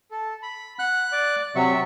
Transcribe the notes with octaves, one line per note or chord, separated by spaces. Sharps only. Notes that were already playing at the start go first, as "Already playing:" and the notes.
A4
B5
F#5 F#6
D5 D6
C3 F#3 E5 C#6